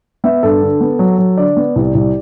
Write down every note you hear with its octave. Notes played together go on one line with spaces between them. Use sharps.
B3 E5
G2 A4
D3
B3
F#3
F#3
D3 D5
B3
C2
C2